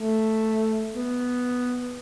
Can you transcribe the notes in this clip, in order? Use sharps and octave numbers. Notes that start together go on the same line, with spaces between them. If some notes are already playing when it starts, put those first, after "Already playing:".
Already playing: A3
B3